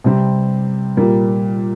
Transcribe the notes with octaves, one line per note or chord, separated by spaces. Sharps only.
C3 G3 C4
A#2 G3 A#3